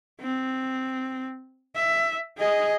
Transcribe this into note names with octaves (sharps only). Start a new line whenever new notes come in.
C4
E5
G#4 D#5